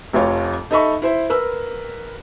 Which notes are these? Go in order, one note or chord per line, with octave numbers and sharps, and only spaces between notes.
F1 F2 F4 C#5 F5
D#4 A4 D#5 E5 B5 C#6
E4 C5 E5
A#4 B4 E6